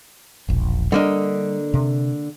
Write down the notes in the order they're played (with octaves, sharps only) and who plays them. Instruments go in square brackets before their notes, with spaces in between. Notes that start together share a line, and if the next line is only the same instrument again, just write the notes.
[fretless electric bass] E1 A#1
[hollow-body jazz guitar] D3 A#3 D#5 [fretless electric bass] G3 C#4 D4
[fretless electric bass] C3